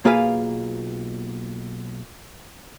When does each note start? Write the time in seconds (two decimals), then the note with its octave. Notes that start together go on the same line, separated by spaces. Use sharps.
0.05 B1 A#3 F4 G#4 B4 F5